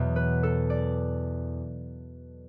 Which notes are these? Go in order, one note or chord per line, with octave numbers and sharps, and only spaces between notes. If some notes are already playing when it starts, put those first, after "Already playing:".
Already playing: E2 B2 F#3
B4
A4
D5